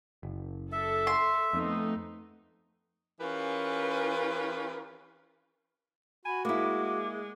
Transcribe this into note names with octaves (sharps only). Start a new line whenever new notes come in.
F#1
A4 E5
C6
F2 A3 B3 D#4
E3 C#4 F4 G4 A#4 B4
F#4 G#5 B5
G#3 A#3 E4 D6